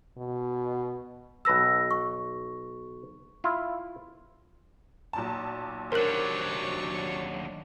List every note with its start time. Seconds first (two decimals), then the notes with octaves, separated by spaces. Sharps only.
0.17 B2
1.45 B1 B4 A5 E6 A#6
1.91 C#6
3.44 E4 F4
5.13 B1 A#2 A5
5.92 D#2 F#3 D4 A#4 C5 C#5 F#6 F#7